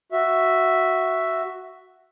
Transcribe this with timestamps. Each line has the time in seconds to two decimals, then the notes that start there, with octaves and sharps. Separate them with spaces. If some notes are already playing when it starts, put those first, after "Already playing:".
0.12 F#4 E5